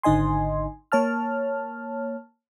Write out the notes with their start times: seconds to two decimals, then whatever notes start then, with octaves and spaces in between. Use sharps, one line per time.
0.03 G#1 D3 D#4 D#5 G#5 C6
0.92 A#3 C#5 A5 F6